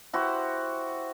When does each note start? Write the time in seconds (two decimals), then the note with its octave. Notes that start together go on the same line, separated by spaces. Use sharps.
0.13 E4 F#4 G4 C5